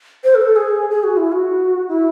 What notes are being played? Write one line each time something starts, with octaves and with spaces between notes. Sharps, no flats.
C5
A4
C5
A4
G#4
G#4
F#4
E4
F#4
E4